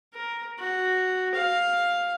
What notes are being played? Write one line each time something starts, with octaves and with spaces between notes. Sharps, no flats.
A#4
F#4
F5